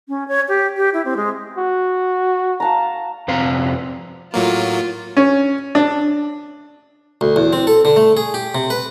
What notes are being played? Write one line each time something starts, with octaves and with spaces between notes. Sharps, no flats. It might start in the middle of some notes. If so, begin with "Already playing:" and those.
C#4
C#5
G4
G4
E4
C4
G#3
F#4
F5 A5 A#5
F2 C3 B4 F5 A#5
A2 F#3 A#3 F4
C#4
D4
D2
E2
C4
A4
D3
A3
G#4
G4
C3
B4